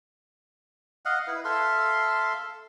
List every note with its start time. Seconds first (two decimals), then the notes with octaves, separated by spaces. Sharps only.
1.05 D#5 F5 F#5
1.27 E4 B4
1.45 A4 E5 F5 C6